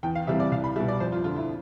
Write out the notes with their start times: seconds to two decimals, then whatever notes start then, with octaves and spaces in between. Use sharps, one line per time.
0.03 E2 G5
0.15 F5
0.27 C3 E3 G3 E5
0.40 D5
0.51 C2 F5
0.64 B5
0.76 B2 G3 E5
0.88 D5
1.00 F2 C5
1.12 F4
1.24 D3 F4
1.28 F3
1.36 E4